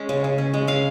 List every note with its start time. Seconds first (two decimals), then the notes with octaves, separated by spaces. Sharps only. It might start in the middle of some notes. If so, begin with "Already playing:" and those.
Already playing: G#3 C#4
0.09 C#3
0.24 C#3
0.38 C#4
0.54 G#3
0.67 C#3 F5